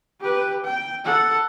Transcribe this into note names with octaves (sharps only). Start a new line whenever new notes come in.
G4 B4
G5
A4 F#5